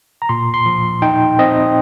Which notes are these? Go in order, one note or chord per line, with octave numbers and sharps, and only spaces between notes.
A#5
A#2 C6
C6
F3
D#4 G5
C4 D#5